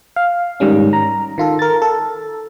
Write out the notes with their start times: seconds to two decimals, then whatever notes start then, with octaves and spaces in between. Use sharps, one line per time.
0.16 F5
0.60 G#2 D#3 G3 C#4
0.93 A#5
1.38 D#3 F4 A4
1.59 A#4 A6
1.82 A4